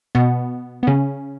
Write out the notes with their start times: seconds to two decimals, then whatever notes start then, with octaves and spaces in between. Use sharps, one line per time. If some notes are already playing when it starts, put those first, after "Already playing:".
0.15 B2 B3
0.83 B3
0.87 C#3 C#4